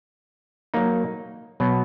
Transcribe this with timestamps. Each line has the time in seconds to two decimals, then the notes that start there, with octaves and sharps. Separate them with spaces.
0.74 F#3 A#3 D#4
1.60 B2 F#3 B3